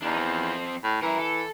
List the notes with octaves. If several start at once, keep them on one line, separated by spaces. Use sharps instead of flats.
E2 D4 D#4
F3 C4
A2
E3 A#4 E5
A4